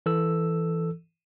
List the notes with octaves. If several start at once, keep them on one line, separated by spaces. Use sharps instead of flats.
E3 A4 E6